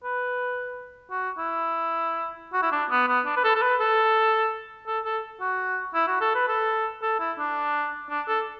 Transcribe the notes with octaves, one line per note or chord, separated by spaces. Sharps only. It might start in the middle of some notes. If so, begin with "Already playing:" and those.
B4
F#4
E4
F#4
E4
D4
B3
B3
D4
B4
A4
A4
B4
A4
A4
A4
F#4
E4
F#4
A4
B4
A4
A4
E4
D4
D4
A4